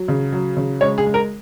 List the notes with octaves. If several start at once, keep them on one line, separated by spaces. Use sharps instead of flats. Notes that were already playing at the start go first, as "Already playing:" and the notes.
Already playing: F#3
C#3
F#3
C#3
G#3 C#5
G#4
G#3
A#4